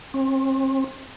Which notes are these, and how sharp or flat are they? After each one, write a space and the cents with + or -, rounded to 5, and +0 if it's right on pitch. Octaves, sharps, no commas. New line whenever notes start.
C4 +40